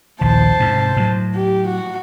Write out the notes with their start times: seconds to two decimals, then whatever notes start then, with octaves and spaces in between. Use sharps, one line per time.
0.21 A#1 D#2 C5 A5
0.60 G#2 C3
0.97 A2 F#3
1.35 G4
1.67 F#4